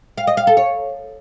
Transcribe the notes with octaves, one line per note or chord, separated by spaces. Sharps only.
F5
D#5
F5
A4
C#5